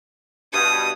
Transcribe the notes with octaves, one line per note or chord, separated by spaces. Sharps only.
G2 B2 D#6